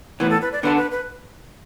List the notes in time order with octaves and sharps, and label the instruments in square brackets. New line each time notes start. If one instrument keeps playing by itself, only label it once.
[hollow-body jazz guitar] A2 E3 B3 [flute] B4
[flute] A4
B4
D5
[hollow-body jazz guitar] D3 B3 D4 A4 [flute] B4
[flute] B4
B4